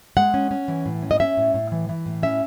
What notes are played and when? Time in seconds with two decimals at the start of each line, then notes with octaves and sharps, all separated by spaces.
0.17 G#3 F#5
0.34 C#4
0.51 C#4
0.68 E3
0.86 A2
1.03 C#4
1.11 D#5
1.20 C#4 E5
1.37 A2
1.54 A2
1.72 E3
1.89 E3
2.06 A2
2.23 C#4 E5